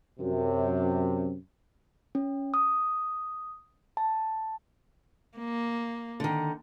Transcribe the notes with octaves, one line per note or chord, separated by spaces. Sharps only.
F#2 C3
C#4
D#6
A5
A#3
D3 D#3